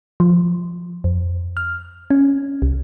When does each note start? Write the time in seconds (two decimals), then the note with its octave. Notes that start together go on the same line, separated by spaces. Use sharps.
0.20 F3
1.04 F2
1.57 F6
2.10 C#4
2.62 C2